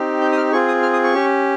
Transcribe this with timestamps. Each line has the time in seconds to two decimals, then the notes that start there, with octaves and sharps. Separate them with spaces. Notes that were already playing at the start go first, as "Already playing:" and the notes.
Already playing: C4 D#4 G4
0.21 G6
0.32 D#6
0.37 F6
0.52 C4 F4 G#4 C#6
0.68 D#6
0.82 F6
0.93 D#6
1.04 C#6
1.14 C#4 G4